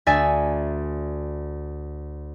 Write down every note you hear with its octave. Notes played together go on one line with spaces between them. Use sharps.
D2 E5 G#5 A6